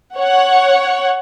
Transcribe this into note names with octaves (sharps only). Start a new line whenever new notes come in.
C#5 F#5